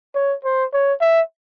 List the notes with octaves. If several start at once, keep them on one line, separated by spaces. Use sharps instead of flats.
C#5
C5
C#5
E5